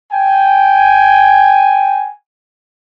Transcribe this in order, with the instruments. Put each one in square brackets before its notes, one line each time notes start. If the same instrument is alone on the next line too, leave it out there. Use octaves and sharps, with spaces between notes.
[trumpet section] G5 G#5